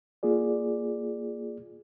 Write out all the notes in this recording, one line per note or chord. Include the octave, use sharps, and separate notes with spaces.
A#3 F4 G#4 D5